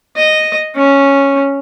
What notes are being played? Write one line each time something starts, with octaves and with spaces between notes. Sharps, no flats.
D#5
C#4